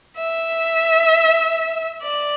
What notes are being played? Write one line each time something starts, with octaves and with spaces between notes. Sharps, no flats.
E5
D5